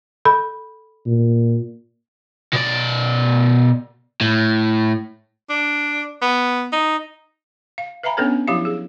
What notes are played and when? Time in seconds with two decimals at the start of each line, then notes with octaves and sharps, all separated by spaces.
0.25 A4 B5
1.07 A#2
2.53 B2 D5
4.21 A2
5.50 D4
6.22 B3
6.72 D#4
7.78 F5
8.03 B4 E5 F5 G#5 A#5 B5
8.17 B3 C#4 D4 A4 B4 C#5
8.48 F3 F#3 E4 G4 E5 F5
8.65 G#4